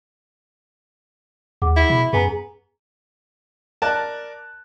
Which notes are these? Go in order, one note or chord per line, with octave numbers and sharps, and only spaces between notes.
D#2 G#4 F#5 D6
E4
B2 B5
F#2 B3 G#4 G#5 A#5
A#4 D5 A5 F#6